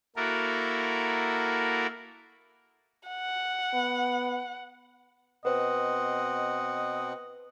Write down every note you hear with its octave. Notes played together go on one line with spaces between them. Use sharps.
A#3 E4 F#4 A4 A#4
F#5
B3
B2 C4 B4 C5 D#5 F#5